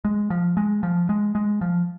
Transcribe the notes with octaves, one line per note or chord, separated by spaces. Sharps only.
G#3
F3
G#3
F3
G#3
G#3
F3